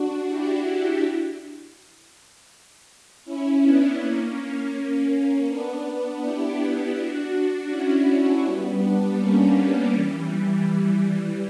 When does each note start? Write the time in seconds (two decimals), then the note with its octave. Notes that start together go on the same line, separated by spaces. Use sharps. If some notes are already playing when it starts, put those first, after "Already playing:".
Already playing: D4 F#4
0.28 E4 G4
3.25 C#4 E4
3.62 B3 D4
3.99 A#3 C#4
5.47 B3 D4
6.22 E4 G4
6.96 D4 F#4
7.71 C#4 E4
8.45 G3 B3
8.82 B3 D4
9.19 A#3 C#4
9.56 G3 B3
9.93 E3 G3